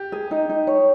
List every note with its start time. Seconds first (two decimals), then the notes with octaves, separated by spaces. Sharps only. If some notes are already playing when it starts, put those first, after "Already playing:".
Already playing: G4
0.12 G#4
0.31 D#4
0.49 D#4
0.67 C#5